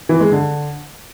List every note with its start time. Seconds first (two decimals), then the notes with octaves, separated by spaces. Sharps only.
0.09 E3
0.21 G#3
0.32 D3